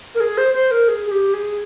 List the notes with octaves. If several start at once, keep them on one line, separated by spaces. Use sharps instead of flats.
A#4
G#4
C5
C5
A#4
G#4
G#4
G4
G#4